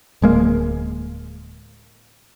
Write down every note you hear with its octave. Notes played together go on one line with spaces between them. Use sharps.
D1 G#3 A#3